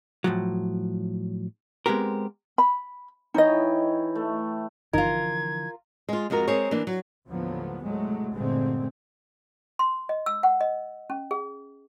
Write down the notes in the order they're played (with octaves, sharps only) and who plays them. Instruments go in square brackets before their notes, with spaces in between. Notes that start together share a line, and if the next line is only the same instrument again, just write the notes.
[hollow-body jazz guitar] A2 F3 F#3
G#3 B3 C4 G4 A#4
[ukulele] B5
[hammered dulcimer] E3 C#5 G5 [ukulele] D#4 D#5
[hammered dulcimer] A3
[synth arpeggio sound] G1 D#4 [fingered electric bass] D3 E3 F3 [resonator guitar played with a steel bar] F4 A#4 [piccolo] G#6
[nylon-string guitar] G#3 F4
F2 G#3 F4 F#4 A#4
G#3 C4 G#4 A#4 C#5
E3 A#3 D4
F#3
[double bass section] D#2 A2 D3 F3 F#3 B3
A2 C3 F#3 G#3 A3
G1 A#2 D3 G#3 A3 C4
[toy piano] C6
D#5
E6
F#5
D#5
C#4
G#4